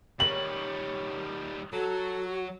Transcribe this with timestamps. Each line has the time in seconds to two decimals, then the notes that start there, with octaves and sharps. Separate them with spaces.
0.20 D#3 G3 C#5 F#7
1.73 F#3 F#4 A4